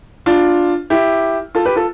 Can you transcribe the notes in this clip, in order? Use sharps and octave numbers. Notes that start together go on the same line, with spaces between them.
D4 F4
E4 G4
F4 A4
G4 B4
F4 A4